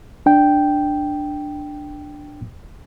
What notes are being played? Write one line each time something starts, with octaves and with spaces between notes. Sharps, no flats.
D4 G5